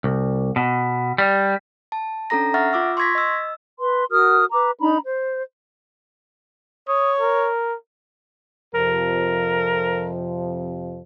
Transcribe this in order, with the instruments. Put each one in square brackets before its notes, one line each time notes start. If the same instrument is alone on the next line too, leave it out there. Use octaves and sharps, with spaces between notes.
[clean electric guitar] C2
B2
G3
[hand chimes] A5
C#4 D4 A4 A#5 A#6
E5 F#5 C#6 F6 A6 A#6
F4 D6 E6
C6 C#6 E6 G#6 A#6 B6
D#5 E6
[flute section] B4 C6
F#4 A#4 D#6 F6
B4 A#5 D6
D4 D#4 A#5 B5
C5
[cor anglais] C#5 [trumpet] D#6
[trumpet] A#4
[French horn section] F2 C3 F3 [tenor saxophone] A#4